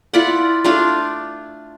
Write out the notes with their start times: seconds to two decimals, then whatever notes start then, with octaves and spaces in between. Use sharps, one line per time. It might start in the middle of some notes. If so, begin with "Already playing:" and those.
0.14 E4 F4 D5 F#5
0.64 A3 D4 F4 F5